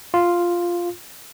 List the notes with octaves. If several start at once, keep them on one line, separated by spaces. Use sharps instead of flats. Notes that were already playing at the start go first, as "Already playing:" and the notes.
F4